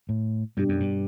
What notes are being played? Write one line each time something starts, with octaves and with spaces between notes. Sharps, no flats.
A2
G2 B2 G3 D4 G4
F#2
G2